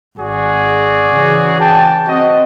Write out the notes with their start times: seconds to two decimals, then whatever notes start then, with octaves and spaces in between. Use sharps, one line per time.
0.19 G#1 F#4 G#4 D5
1.12 C#3 E3
1.60 G5 A5
2.07 C4 F#4 D#5